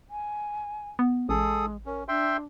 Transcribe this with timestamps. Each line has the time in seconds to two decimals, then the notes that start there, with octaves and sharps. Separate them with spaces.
0.10 G#5
0.99 B3
1.29 A1 G#3 G#4 A4 D#6
1.86 C#4 A#4
2.08 D4 E5 G5 C6